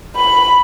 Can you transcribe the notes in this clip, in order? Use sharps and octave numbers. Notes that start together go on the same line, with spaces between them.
B5